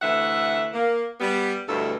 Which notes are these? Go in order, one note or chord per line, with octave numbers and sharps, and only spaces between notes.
D2 E3 A3 E5 F#5
A#3
G3 B3
D2 G2 B2 E4 A4